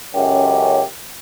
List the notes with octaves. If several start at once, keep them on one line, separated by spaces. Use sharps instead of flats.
C#2 F#2 C#4 G4